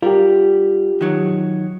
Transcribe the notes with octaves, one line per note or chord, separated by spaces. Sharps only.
G3 F4 G4 A#4
D#3 F#3